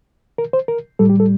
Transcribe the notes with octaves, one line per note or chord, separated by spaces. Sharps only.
A#4
C5
A#4
A2 G3 A4
G4
A4